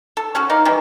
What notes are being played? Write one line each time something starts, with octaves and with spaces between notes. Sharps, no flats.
A4
C#4 F#4 G#4
D#4 A#4 D5 F5
D#3 E3 F#3 G3